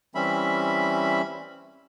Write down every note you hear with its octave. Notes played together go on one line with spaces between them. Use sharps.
E3 G3 C4 C#4 E5 B5